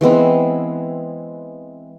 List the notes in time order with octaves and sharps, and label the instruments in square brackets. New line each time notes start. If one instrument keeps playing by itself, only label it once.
[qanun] E3 G#3 B3 C4